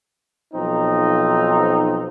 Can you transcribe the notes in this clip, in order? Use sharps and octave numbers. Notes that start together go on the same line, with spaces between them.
B1 F3 C4 D#4